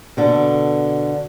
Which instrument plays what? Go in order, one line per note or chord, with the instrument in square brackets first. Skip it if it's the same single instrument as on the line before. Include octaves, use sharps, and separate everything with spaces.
[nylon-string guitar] B2 D3 A4